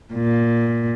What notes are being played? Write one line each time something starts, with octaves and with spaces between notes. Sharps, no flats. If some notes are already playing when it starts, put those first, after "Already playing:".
A#2